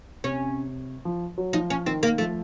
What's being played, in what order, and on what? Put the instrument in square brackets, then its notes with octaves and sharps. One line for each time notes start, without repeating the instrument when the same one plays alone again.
[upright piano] C3 [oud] C#4
[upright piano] F3
F#3
[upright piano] F3 [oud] D#4
[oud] C#4
[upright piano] D#3 [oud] C4
[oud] A#3
[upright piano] F3 [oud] A3